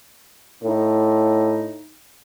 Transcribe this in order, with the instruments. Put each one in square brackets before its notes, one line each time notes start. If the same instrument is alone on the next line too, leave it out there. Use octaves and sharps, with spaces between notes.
[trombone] A2 [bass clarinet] D#4